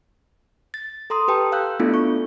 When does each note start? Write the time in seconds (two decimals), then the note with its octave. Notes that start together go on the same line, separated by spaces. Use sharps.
0.74 A6
1.10 A4 A#5 C6 D#6
1.28 G4 B4 G5 A5
1.52 F5 E6 F#6 G6
1.79 A3 B3 D4 E4 F4 A4
1.94 C#6